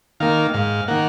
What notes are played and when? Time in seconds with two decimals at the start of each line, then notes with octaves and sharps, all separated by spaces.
0.20 D#3 A#3 F5
0.54 G#2 F5
0.88 D#3 A#3 F#5